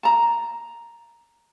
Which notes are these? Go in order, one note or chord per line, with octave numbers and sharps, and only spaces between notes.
A5 A#5